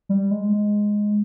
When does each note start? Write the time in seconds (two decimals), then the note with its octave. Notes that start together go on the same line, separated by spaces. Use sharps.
0.09 G3
0.31 G#3
0.53 G#3